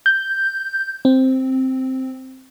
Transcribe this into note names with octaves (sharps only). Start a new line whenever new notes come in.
G6
C4